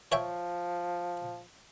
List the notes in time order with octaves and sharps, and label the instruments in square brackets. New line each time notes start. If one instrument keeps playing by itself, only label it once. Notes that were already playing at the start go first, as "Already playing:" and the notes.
[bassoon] F3 [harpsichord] C#5 E5 G5